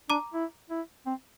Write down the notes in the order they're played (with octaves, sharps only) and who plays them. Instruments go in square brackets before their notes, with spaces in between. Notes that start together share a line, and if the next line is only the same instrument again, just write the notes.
[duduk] D4 [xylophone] A#5 D6
[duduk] E4
E4
C4